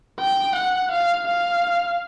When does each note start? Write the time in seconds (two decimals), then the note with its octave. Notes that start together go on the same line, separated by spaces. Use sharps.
0.20 G5
0.56 F#5
0.92 F5
1.27 F5